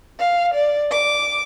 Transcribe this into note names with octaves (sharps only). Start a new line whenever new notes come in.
F5
D5
D6